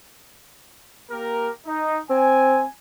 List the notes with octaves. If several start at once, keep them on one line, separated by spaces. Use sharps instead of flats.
A#3 G4 A#4
D#4
C4 G#5